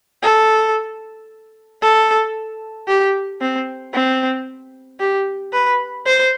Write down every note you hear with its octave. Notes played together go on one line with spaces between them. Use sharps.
A4
A4
G4
C4
C4
G4
B4
C5